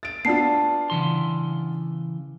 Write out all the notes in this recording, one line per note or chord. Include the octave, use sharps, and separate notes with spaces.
A6 D7
B3 D4 F4 A5 C7
C#3 E3 C6